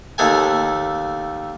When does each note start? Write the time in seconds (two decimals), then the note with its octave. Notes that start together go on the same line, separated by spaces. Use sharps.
0.18 D#2 A3 G#5